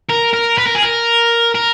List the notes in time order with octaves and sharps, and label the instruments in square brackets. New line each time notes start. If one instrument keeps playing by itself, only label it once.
[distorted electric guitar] A#4
A#4
B4
A#4
G#4
A#4
A#4